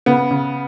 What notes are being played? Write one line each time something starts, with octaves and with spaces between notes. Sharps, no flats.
C#3 B3
C#3